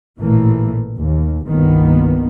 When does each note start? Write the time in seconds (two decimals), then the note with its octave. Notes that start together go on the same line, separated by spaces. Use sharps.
0.19 A1 A#2 E3 A3 A#3
0.98 D#2
1.47 G1 C2 D#3 A#3 B3